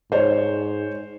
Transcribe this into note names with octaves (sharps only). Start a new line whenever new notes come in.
G#2 C5 C#5